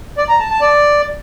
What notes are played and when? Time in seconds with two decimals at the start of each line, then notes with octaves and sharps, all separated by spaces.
0.18 D5
0.28 A#5
0.39 A5
0.50 A5
0.61 D5